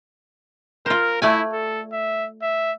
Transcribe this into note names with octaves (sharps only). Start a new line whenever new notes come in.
F4 A#4 C5
A3 E4 D5 G#5
A4
E5
E5